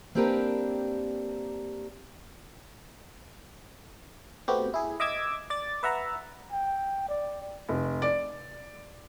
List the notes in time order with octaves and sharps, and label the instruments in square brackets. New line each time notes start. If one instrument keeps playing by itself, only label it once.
[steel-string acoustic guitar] A#3 C4 D4 G4 A#4 B4
[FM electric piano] A3 B3 C4 F#4 G4
E4 G#4
D#5 E5 D6 E6 G#6
D5 A6
B4 E5 F#5 A#5
[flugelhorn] G5
D5
[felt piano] F1
D5